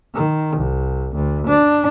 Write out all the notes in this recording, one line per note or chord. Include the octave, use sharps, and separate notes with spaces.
D#3
C2
D2
D4